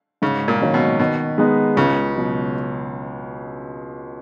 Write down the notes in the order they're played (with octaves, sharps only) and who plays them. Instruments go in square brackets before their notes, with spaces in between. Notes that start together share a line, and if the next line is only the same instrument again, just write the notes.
[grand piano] G#2 [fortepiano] C#3
[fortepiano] A#2
[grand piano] D#3 F#3 A#3 C#4
[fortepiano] B2
[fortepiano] B2 [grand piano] D#3
[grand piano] G#3 B3 D#4
[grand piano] C#2 [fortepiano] C#3
[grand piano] B2 F#3